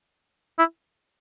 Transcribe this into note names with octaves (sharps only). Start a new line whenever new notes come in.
E4